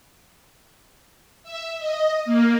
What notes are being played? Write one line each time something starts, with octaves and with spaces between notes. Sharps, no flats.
E5
D#5
A#3